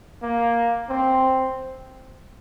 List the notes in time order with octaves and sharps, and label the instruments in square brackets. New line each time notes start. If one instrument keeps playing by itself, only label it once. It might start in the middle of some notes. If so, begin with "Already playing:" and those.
[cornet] A#3
C4